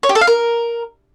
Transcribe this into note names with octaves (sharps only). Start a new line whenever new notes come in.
C#5
G4
A4
F5
A#4